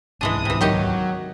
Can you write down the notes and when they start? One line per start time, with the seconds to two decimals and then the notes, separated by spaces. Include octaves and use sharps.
0.21 D1 C2 G#2 E3 G#3 D4 D#6
0.45 C3 E3
0.61 D#3 F#3 G4 D#5